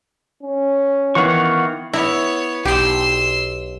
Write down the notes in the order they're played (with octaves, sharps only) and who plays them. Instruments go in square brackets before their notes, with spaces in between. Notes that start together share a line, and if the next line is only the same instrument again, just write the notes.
[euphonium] C#4
[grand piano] D#3 E3 B3 [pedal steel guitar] F5 F#5 C#6
[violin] B3 C#5 [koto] E4
[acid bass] B1 [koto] G4 [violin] C6 E6